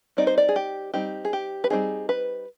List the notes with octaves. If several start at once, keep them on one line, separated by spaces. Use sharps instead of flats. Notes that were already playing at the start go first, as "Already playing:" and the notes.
G3 C4 D#4 D5
C5
D5
G#4
G4
G3 C4 D#4 G4
G#4
G4
B4
G3 C4 D#4 G#4
B4